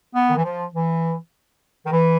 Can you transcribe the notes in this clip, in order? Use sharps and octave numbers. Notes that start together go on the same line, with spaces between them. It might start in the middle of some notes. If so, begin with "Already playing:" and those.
B3
D#3
E3
F3
E3
D#3
E3